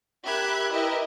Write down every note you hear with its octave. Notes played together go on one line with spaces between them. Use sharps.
G4 A#4 E5 B5 F#6 G#6
E4 G4 A#4 B4 D#5 E5